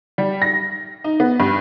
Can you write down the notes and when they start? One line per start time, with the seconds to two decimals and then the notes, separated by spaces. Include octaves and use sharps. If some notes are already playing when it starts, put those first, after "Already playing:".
0.18 G3
0.42 A#6
1.04 D#4
1.20 B3
1.40 G2